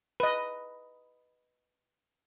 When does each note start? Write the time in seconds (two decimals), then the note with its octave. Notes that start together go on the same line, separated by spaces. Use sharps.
0.20 B4 D#5